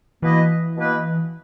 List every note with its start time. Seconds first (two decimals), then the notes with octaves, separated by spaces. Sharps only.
0.22 B2 E3 A#3 E4 B4 D#5
0.77 B2 A#3 E4 B4 D#5